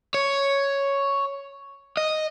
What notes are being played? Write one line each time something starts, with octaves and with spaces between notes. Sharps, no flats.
C#5
D#5